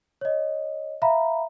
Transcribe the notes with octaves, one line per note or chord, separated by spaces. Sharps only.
C#5 D#5
E5 F5 A#5 B5